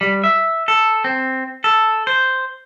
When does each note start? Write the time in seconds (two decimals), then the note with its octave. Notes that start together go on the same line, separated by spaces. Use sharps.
0.01 G3
0.24 E5
0.68 A4
1.04 C4
1.64 A4
2.07 C5